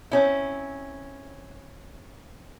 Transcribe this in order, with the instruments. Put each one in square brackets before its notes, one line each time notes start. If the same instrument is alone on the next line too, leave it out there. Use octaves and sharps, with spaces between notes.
[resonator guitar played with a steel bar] C4 C#4 E4